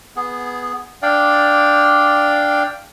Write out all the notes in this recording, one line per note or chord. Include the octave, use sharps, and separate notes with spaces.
B3 G#4
D4 D5 F5 G5